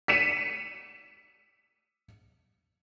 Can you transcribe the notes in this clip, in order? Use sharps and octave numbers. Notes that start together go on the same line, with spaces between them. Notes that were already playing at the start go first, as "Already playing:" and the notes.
B6 C#7 D#7 E7